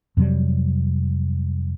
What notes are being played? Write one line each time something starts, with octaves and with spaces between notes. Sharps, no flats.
F2 C3 F#3 G3